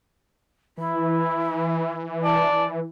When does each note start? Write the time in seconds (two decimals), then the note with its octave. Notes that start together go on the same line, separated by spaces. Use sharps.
0.77 E3 E4
2.24 D5 A5